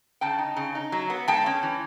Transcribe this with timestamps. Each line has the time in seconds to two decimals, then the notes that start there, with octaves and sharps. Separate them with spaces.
0.21 C#3 G5 A5
0.38 D#4
0.57 C#3
0.75 D#4
0.92 F#3
1.10 B3
1.28 G#3 G5 A5
1.46 C#4
1.63 E3